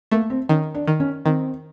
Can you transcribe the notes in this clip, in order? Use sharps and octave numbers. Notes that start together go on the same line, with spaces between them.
A3 A#3
C4
D#3 C#4
D4
D#3
C#4
D#3 C4